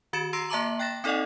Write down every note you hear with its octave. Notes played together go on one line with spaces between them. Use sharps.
D#3 F#4 A6 C#7 D7 E7
A#5 C6 E6 A#6 C7 D7
A#3 E5 A5 A#5 D6 F#7
G5 F#6 A6 A#6 E7
C4 D#4 A4 D5 D#5 F#5